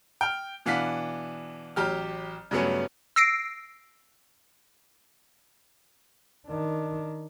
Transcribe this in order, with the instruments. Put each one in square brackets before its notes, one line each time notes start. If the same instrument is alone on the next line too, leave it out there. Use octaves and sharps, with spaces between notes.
[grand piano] G5 F6
B2 E3 D4 F5 F#5 B6
A1 F#3 G4 F6
G2 C#3 F#3 A3 B3 C#4
[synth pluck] E6 A#6 C7 D7
[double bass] D#3 D4